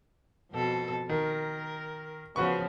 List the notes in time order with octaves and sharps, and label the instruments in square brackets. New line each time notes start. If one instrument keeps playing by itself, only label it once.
[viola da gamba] F2 B2 A4
[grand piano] D#3 [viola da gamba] A#4
[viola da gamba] C#3 F3 B3 [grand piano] F#4 B4 C#6